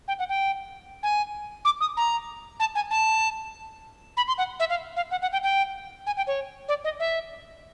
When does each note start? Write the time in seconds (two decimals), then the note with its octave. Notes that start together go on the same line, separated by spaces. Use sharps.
0.08 G5
0.19 F#5
0.29 G5
1.03 G#5
1.65 D6
1.81 D#6
1.97 A#5
2.60 A5
2.75 G#5
2.91 A5
4.17 B5
4.28 C6
4.38 F#5
4.60 E5
4.70 F5
4.96 F5
5.11 F#5
5.22 F#5
5.33 G5
5.43 G5
6.07 G#5
6.17 G5
6.27 C#5
6.68 D5
6.84 D#5
7.00 E5